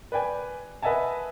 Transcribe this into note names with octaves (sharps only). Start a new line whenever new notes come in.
B4 D5 G5 G#5
B4 D#5 E5 F#5 G#5 A5